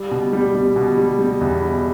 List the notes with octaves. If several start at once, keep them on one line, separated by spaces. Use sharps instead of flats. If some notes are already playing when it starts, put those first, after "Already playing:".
Already playing: G3
B2
G3
G3
B2
G3
G3
E2
B2